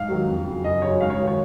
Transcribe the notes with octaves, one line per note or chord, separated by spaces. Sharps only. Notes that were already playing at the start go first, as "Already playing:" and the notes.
Already playing: G#2 F5
D#3 F#3
F2
C#3 F#3
F#2 D#5
C#3 F#3 C#5
G#2 F5
C#5
D#3 F#3
C#5